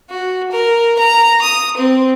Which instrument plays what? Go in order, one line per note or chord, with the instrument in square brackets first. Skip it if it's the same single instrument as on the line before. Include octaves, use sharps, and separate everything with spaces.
[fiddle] F#4
A#4
A#5
D#6
C4